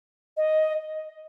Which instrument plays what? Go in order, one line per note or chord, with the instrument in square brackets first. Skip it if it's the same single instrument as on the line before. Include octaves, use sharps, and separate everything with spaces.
[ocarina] D#5